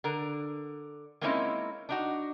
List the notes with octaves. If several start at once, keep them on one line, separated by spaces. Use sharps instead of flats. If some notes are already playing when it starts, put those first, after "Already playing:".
D3 A#4
G#3 A#3 C4 C#4 D#4 E4
D4 D#4 F#4